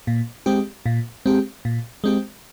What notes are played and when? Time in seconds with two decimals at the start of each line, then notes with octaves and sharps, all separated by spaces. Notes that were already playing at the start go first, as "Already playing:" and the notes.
0.07 A#2
0.46 G#3 C4 G4
0.86 A#2
1.26 G#3 C4 G4
1.65 A#2
2.04 G#3 C4 G4